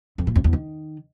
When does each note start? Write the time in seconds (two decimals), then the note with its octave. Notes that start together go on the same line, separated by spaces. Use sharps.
0.18 F2
0.27 A#2
0.36 F2
0.44 E2
0.53 D#3